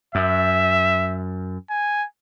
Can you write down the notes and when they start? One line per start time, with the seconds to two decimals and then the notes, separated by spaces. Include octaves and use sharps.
0.15 F#2 E5
1.70 G#5